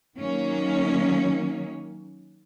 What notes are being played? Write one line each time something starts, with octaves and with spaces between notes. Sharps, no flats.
D#3 F#3 A#3 C#4